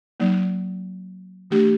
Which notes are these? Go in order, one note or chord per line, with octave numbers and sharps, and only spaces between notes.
F#3 A#3 D#4
E3 A3 D4 G4